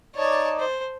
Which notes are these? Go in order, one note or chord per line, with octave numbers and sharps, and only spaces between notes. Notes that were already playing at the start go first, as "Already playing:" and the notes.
D#4 C#5 D5 A5
C5